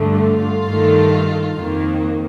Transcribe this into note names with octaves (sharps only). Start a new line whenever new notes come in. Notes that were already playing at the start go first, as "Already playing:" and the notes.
Already playing: G2 D3 A3
F4
G2 D#3 A3
F2 D#3 A#3